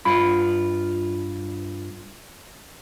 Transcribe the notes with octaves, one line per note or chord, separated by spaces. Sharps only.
G2 F4 B5